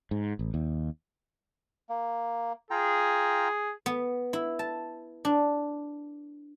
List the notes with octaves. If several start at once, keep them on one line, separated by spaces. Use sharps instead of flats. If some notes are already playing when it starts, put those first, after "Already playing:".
G#2
A1
D#2
A#3
F4 G#4 G5 A#5
B3
E4
A5
D4